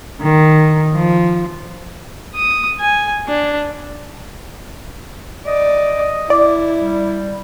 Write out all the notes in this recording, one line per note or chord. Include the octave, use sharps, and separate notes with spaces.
D#3
F3
D#6
G#5
D4
D5 D#5
E4 D5
G3